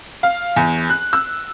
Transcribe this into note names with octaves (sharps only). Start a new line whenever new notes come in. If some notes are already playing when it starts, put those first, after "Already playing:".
F5
E2
F#6
E6